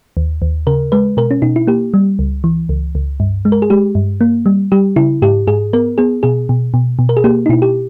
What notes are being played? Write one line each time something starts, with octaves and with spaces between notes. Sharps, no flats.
D#2
D#2
C#3 A#4
G#3 B4
B2 A#4
C#4
B2 D#4
E4
A#3 G4
G3
C#2
E3
C#2
C#2
G2
G#3
A#4
G#4
G#3 G4
G2
A#3
G3
G3 G4
C#3 E4
G#2 G4
G#2 G#4
B3 A#4
B3 G#4
B2 G#4
B2
B2
B2
A#4
G#4
A#3 G4
D#4
B2 E4
G4